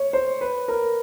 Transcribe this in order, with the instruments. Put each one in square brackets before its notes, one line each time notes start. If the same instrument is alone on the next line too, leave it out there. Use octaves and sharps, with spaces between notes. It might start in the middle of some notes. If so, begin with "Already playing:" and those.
Already playing: [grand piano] C#5
C5
B4
A#4